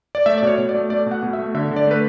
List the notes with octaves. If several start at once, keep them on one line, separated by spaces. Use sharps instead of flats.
D5
A3 E5
D5
B2 C#5
B2
D5
A3
A3 D5
B2
F#5
B2
E5
A3
D3 E5
D3
D5
A3 B4